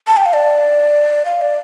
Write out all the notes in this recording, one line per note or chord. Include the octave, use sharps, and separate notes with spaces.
A5
G5
F5
D5
F5
D5